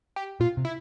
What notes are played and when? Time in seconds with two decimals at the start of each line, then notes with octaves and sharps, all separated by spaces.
0.16 G4
0.40 A#2 F4
0.57 C3
0.65 E4